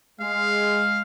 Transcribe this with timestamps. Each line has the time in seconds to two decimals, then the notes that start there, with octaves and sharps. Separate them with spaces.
0.20 G#3 F5